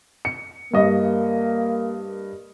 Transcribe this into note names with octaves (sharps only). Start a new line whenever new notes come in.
C#7
G2 A#3 D#5